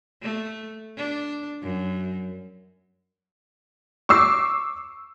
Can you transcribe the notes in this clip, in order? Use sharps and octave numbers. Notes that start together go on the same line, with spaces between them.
A3
D4
F#2
C#6 D6 E6 C7